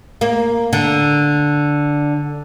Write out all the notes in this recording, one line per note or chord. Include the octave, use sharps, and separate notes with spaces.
A#3
D3